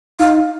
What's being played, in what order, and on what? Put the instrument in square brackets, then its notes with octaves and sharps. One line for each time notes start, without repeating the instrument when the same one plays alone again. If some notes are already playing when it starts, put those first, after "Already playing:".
[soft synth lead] D#4 [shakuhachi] F5